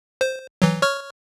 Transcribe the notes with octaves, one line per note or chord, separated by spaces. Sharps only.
C5
E3 F#3
C#5 C#6 F6